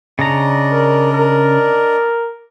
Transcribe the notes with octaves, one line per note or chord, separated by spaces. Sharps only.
C#3 D4 D5 D#5 A#5
A#4
A#4